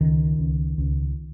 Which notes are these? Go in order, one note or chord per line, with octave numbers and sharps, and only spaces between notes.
C#2 D#3
C#2
C#2